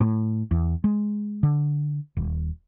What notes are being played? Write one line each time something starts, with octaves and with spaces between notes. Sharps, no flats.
A2
E2
G#3
D3
D#1